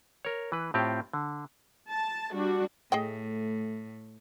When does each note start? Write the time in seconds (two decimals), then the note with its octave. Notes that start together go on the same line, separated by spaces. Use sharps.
0.25 A#4 C#5
0.52 E3 B4
0.74 A2 C4 F4 G4
1.13 D3
1.90 A5
2.33 G3 D4 F#4
2.92 A2 A3 G#4 D#5 G5